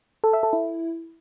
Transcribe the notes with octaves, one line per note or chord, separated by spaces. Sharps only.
A4
E5
A4
E4